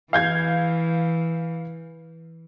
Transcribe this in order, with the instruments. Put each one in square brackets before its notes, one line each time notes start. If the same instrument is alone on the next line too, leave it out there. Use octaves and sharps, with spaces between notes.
[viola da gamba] E3 [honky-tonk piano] F5 G6 G#6